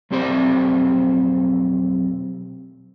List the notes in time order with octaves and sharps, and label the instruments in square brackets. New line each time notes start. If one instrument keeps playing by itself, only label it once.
[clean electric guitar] B1 F2 C4 G4 C5 D5